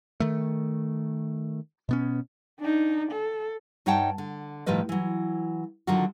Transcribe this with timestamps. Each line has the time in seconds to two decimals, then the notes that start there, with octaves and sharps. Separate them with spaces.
0.20 D#3 A3
1.89 B2 B3 C#4
2.60 D4 D#4
3.12 A4
3.86 G2 D#4 C#5 F#5 G5 A5
4.18 D3
4.66 A2 D#3 F3 G3 B4 D#5
4.89 E3 F#3
5.87 D3 D#3 F#3 F4 F#4